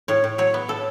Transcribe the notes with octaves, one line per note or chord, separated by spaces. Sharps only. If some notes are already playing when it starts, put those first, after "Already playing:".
A2 C#5
A2
F#3 C#5
B3
A2 A4